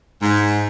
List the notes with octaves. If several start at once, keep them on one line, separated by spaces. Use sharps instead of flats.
G#2